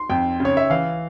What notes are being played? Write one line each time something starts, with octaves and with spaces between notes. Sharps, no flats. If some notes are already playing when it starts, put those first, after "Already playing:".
Already playing: C6
F2 G5
C#3
C#5
E5
E3 F5